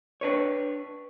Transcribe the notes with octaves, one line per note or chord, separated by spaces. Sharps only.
D4 B4 C#5